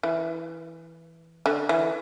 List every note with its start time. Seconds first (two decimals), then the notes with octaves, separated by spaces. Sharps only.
0.03 E3
1.46 D3
1.69 E3